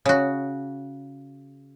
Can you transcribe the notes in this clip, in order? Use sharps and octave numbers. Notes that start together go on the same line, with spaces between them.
C#3 F#4